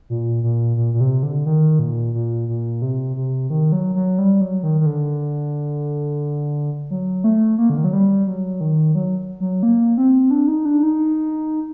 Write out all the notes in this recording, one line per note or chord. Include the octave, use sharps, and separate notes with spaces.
A#2
A#2
A#2
A#2
C3
D3
D#3
A#2
A#2
A#2
C3
C3
D#3
F#3
F#3
G3
F#3
D#3
D#3
D3
F#3
A3
A#3
D3
D#3
F#3
G3
F#3
D#3
F#3
F#3
A#3
C4
D4
D#4
D4
D#4